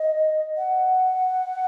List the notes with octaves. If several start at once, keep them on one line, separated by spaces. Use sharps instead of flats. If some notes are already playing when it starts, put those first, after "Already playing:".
Already playing: D#5
F#5